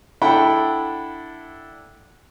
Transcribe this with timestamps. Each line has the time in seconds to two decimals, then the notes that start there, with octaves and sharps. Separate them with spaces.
0.22 D4 E4 A4 F#5 G5 B5